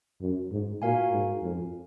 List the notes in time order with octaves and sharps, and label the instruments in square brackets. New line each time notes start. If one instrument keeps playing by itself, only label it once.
[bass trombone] F#2
G#2
[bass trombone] A#2 [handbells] F#4 A#4 F5 G#5
[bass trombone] G#2
F2